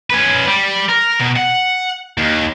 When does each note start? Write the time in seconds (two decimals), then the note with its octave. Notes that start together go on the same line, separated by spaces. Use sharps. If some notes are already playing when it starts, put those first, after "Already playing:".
0.10 C#4 B4
0.47 G3
0.89 A#4
1.20 B2
1.37 F#5
2.18 D#2